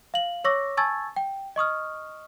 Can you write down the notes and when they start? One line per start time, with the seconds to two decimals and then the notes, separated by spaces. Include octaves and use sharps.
0.14 F5 F#7
0.44 C#5 C#6 D6 E6 A#6
0.77 G#5 A5 C#6 E6 G#6 A6
1.16 G5
1.56 D#5 C#6 D#6 F6